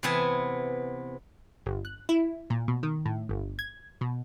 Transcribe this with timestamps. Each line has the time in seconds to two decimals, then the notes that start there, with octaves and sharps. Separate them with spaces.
0.03 C3 E3 B3 G#5 A5
1.66 G1
1.85 F#6
2.09 E4
2.50 A#2
2.68 B2
2.83 D#3
3.06 A2
3.29 G1
3.59 G#6
4.01 B2